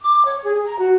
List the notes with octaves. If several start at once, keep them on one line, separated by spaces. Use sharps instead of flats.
D6
C#5
G#4
A#5
F#4